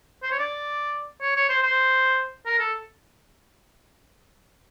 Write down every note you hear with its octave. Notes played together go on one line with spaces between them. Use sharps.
C5
C#5
D5
C#5
C#5
C5
C5
A#4
A4